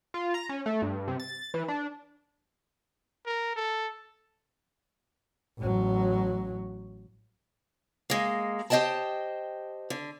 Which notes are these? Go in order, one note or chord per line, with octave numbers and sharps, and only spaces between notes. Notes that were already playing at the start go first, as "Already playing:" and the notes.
F4
A#5
C#4
A3
G2
C3
A6
E3
D4
A#4
A4
A1 F#3
G#3 A#3
G4 C5 D5 D#5 G5 A5
D3